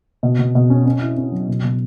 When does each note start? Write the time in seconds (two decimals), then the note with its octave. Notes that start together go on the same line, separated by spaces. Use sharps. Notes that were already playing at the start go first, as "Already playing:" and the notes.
0.23 B2
0.39 B2
0.55 B2
0.70 C#4
0.86 C#4
1.01 E4
1.17 C#4
1.32 F#3
1.48 B2
1.64 B2